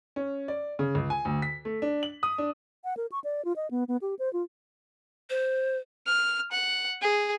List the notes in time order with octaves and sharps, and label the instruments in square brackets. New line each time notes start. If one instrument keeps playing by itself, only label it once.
[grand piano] C#4
D5
C#3
C#2
G#5
D2
B6
A3
D4
F#7
D#6
D4
[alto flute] F#5
A#4
C#6
D5
F4
D#5
B3
B3
G4
C5
F4
[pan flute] C5
[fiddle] F6
F#5
G#4